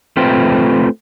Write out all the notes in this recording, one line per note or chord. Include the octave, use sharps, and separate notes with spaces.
A3 C4 F4 B4 C5 G5